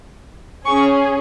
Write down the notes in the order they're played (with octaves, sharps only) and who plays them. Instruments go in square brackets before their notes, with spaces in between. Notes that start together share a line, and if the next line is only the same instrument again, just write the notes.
[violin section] C#4 G#4 C#6